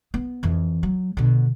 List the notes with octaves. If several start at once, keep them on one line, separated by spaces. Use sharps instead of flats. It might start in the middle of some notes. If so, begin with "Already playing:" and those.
B3
F2 E3
F#3
B2 D3